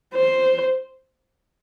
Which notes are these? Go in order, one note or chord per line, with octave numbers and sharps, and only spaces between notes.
C5